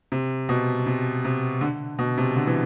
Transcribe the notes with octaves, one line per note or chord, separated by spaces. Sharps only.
C3
B2
C3
C3
D3
B2
C3
D3
E3